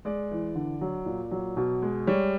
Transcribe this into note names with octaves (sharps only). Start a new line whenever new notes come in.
G#3 D5
E3
D3
F#3
A#2
F#3
B2
G#3
G3 C#5